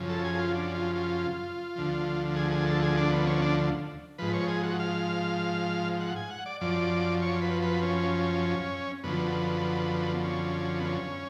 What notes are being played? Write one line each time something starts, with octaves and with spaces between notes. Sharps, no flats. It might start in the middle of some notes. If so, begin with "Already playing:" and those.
Already playing: F#2 C#3 F3
A4
G#4
F4
D4
F4
F4
D2 D3 F3
G#4
G#4
A4
G#4
D4
B3
C#4
D4
G#2 F3 B4
C#5
G#4
F#4
F5
F#5
G#5
F#5
D5
F#2 F3 D5
C#5
B4
B4
C#4
F#2 D3 F3 B3
C#4
B3
C#4